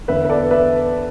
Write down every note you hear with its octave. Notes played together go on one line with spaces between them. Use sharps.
E2 D3 B3 B4 E5
B4
A4 D5
B4 E5